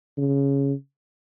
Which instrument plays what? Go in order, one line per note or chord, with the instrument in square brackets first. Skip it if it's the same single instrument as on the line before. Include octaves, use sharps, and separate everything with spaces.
[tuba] C#3